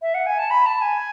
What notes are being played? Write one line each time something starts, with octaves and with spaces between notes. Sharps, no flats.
E5
F#5
G#5
A5
B5
A5
G#5